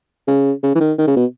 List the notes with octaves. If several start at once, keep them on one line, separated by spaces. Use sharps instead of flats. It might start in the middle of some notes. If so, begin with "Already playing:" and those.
C#3
C#3
E3
D#3
D#3
C#3
B2